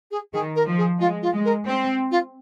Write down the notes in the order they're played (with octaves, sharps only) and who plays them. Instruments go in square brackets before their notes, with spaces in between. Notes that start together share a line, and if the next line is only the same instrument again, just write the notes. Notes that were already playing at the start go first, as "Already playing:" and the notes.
[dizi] G#4
[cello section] D#3 [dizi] G#4
[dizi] A#4
[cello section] F3
[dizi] G#4
[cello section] G#3 [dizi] F4
[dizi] F4
[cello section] G#3
[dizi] A#4
[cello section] C4
[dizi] F4